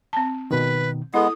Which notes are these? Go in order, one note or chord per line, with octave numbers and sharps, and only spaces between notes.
C4 A5
B2 D#3 B4
G#3 B3 E4 A4 D#6